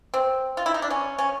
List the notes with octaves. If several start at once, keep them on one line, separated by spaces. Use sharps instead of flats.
C4
F4
E4
D#4
D4
C#4
C#4